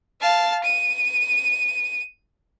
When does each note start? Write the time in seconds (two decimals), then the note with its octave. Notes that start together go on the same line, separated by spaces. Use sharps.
0.22 F5 A5
0.64 D#7